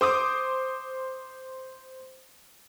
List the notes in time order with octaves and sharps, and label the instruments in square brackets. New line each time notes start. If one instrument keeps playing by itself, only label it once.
[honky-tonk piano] C5 D6 D#6